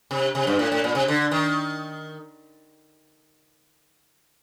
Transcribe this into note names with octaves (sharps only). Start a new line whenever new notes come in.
C3
C3
G2
A2
A2
A#2
C3
D3
D#3